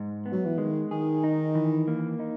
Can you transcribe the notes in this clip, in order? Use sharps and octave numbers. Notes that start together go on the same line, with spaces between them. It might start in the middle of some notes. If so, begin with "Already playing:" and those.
Already playing: G#2
B3
F#3
E3
D#3 G#3
D#3 G#4
D#4
E3
A#3
D#4